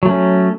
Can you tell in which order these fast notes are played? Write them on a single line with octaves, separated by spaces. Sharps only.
F#3 A3 C#4